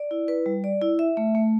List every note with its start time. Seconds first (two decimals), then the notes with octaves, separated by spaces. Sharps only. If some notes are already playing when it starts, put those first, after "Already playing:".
Already playing: D5
0.11 E4
0.28 B4
0.46 G3
0.64 D5
0.82 E4
0.99 E5
1.17 A3
1.35 A3